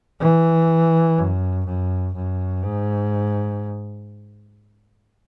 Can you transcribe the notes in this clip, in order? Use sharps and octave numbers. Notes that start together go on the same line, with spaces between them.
E3
F#2
F#2
F#2
G#2